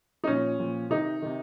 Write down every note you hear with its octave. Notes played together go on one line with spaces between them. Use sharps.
D#4
A#2 F3 C#4
A#2 F3
C3 D#3 D#4
C3 D#3